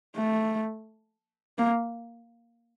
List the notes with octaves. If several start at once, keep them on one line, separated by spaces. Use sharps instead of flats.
A3
A#3